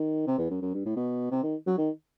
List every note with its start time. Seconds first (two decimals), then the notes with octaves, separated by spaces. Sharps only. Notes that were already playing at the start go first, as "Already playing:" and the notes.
Already playing: D#3
0.27 C3
0.38 E2
0.51 F#2
0.62 F#2
0.74 G2
0.86 A2
0.96 B2
1.31 C3
1.43 D#3
1.67 F#3
1.78 D#3